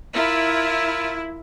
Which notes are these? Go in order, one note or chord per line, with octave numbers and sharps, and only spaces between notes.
E4 F4 A#4